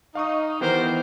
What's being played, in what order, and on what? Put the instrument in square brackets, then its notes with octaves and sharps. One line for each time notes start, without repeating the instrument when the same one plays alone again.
[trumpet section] D#4 [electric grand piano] F5 C#6 D#6
[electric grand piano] D#3 E3 B3 [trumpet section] G4 A#4 C5